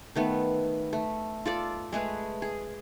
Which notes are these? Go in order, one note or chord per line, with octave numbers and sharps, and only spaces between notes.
D#3 A3 B3
A3
F4 A4 D5
G#3 A3 G#4 B4
G#4